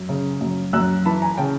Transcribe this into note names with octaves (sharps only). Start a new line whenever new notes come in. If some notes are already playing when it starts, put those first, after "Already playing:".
Already playing: F#2
C#3
F#2
F#2 E6 F#6
E3 A5 B5
G#5 A#5
C#3 G5 A5